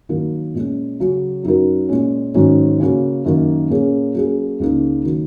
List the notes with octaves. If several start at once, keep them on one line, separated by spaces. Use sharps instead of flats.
D#3 F#3 A#3 F#4 A#4
A#2 G#3 C#4
C#3 F#3 C#4
F#2 F#3 D#4 F#4 A#4
A#2 G#3 C#4
G#2 D#3 F#3 C#4
C#3 A#3 C#4 F#4
F#2 D#3 A#3
A#2 A#3 C#4 G#4
F#3 A#3 C#4 G#4
C#2 C#3 A#3 D#4
D#3 F#3 A#3